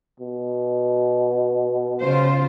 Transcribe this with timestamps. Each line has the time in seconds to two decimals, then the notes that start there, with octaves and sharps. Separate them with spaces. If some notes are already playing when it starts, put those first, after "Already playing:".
0.20 B2
2.00 C#3 F4 C5